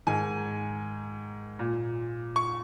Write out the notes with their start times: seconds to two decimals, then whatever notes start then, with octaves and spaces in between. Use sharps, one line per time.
0.07 G#2 D#3 G#5
1.59 A#2
2.36 C#6